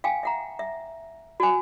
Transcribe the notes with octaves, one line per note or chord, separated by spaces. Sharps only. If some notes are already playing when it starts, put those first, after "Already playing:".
F5 G5 G#5
E5 F#5 A#5
E5
F#4 G#5